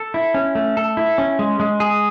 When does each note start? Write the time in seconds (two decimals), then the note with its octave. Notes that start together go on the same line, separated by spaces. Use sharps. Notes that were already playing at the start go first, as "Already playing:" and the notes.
Already playing: A4
0.14 E4
0.34 C#4
0.55 A3
0.77 A4
0.97 E4
1.18 C#4
1.39 G#3
1.60 G#3
1.80 G#4